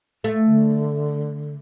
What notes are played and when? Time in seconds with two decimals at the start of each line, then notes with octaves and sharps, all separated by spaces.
0.24 A3
0.46 D3